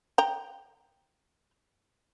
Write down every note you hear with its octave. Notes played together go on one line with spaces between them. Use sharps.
G5 A#5